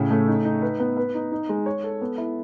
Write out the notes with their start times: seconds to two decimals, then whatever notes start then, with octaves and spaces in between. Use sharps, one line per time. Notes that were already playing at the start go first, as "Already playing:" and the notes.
Already playing: A2 C#3
0.11 A3
0.27 D#4
0.45 D#4
0.62 B4
0.80 B3
0.97 B4
1.14 D#4
1.32 D#4
1.49 G#3
1.66 C#5
1.84 A4
2.01 B3
2.18 E4